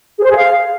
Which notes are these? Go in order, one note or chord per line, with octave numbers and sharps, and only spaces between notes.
G#4
C5
G#4
F5